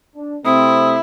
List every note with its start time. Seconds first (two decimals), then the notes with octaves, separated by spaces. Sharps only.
0.16 D4
0.45 C3 A3 C4 E4 D#6